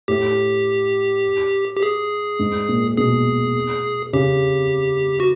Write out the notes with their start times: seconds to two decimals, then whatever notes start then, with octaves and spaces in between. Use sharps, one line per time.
0.08 A2 G4
1.77 G4
1.83 G#4
2.39 G#2
2.69 A#2
2.97 B2 G#4
4.13 C#3 G4
5.20 F#4